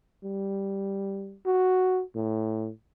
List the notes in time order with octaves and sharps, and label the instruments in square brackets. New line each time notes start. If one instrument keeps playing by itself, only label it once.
[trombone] G3
F#4
A2